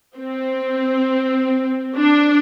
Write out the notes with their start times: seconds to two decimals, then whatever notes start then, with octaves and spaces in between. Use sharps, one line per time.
0.16 C4
1.96 D4